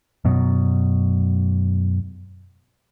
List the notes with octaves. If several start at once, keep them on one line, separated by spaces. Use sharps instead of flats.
F#2 B2 F#3